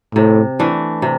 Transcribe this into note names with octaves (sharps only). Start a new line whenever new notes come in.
A2 C3
E3 A3 D4
C3